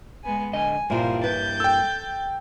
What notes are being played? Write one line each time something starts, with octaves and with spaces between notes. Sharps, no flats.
G#3 B3 G#5
D3 D#5 G#5
G2 A#2 A#3 E4 F4 A#4 C5
B4 G6 A6
A4 G5 E6